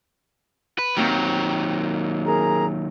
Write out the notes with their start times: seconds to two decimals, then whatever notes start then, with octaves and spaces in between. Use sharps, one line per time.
0.79 B4
0.97 D#2 D#3 F#3 A#3 C4
2.25 G#4 A#4 A#5